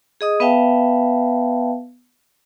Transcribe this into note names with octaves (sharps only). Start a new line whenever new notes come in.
G#4 D#5 D#6
B3 B4 E5 F5 G5 A5